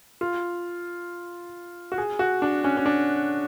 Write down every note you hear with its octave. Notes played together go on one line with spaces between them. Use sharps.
F4
F#4
G#4
F#4
D4
C#4
C#4
D4